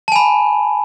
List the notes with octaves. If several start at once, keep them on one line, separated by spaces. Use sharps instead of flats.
G#5 A5 B5